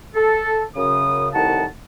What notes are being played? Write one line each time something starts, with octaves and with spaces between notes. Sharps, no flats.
A4
F#2 C#3 D#6
C2 A2 D#3 F#5 A5